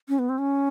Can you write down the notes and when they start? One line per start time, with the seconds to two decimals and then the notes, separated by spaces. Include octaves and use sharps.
0.09 C#4
0.19 B3
0.29 C4
0.38 C#4